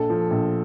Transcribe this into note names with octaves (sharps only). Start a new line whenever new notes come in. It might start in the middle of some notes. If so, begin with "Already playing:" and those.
Already playing: A#1 A4
F3
A#1